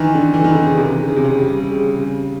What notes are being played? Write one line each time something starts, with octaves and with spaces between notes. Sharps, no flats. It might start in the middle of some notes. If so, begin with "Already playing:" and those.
Already playing: D#3 E3
D3
E3
D#3
D3
C#3
C3
C#3
C3
C#3
G3
C#3
C#3